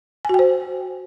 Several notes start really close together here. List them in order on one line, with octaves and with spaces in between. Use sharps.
G#5 F#4 G5 C5